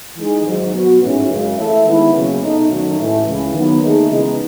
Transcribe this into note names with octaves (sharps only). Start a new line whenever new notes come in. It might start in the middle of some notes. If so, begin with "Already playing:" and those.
E3 G#3 D#4 G#4
G#1 G#2 F#3
B2 F#3 B3 F#4
A1 G#2 E3 G#3 C#4
F#2 C#3 G#3
E3 A3 E4 A4 E5
D#3 G#3 B3 E4
F#1 E2 C#3 F#3 C#4
B2 A3 D#4
F#2 D#3 F#3 A3 D#4
A1 A2 E3 A3
C#2 C#3 E3
D#3 F#3 B3
D#2 D#3 A3 D#4 G#4
C#3 E3 G#3 B3 D#4